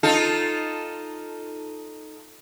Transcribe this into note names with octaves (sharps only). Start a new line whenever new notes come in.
D#4 F4 A4